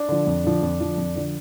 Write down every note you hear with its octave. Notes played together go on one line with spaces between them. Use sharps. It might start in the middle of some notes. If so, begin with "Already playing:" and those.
Already playing: D4
D3 F3
F2
D3 F3
F2
D3 F3
F2
D3 F3